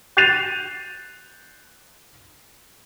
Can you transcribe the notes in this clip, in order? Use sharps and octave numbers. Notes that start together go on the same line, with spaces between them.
F#6 G6 A6 C7 D#7 F7